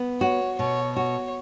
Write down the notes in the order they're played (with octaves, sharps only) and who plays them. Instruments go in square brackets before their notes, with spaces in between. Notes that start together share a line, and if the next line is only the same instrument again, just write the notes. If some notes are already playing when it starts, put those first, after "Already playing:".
Already playing: [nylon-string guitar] B3
[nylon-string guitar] F#4 [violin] C#5
[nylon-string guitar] B2 [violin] C#5
[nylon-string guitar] F#4 [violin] C#5